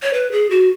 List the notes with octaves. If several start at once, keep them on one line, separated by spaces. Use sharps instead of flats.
C#5
B4
G#4
F#4